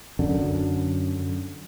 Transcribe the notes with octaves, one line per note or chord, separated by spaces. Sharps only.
F#2 D3